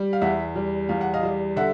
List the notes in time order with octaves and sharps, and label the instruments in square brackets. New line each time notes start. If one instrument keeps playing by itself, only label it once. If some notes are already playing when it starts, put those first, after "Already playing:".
Already playing: [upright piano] G3
F5
E2 E5 F#5
G3
E2 F5
F#5
D#5 F5
G3
D3 E5 F#5